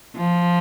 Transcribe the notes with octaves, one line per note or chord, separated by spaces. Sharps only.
F3